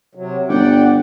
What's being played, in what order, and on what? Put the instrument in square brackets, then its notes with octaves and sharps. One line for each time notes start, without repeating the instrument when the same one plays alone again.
[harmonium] C3 F#3
[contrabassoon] G1 [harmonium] D5 F#5 G5